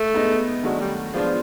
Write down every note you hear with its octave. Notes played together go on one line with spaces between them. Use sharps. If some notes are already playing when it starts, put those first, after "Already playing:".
Already playing: A3
G#3 B3 D#4
D#3 F#3 G#3 A3 D4 F#4
G3
F3 G#3 B3 D4 F4